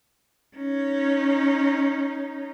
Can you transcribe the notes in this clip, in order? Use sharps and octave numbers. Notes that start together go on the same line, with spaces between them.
C#4 D#4